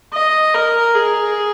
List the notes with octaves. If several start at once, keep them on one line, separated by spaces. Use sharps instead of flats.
D#5
A#4
G#4